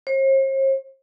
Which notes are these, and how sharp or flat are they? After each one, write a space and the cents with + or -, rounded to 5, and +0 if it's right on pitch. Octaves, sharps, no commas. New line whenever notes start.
C5 +45